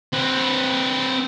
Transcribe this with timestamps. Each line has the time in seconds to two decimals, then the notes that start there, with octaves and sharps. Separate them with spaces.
0.14 C4 B4